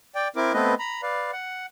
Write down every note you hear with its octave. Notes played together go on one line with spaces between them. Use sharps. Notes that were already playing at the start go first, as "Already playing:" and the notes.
D5 G5
C4 E4 A#4 D6
A3 B3 C4 B4 D#5
A#5 B5
B4 D5 F5
F#5